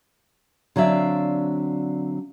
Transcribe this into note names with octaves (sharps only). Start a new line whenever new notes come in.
D3 F#3 C4 D4 E5 F5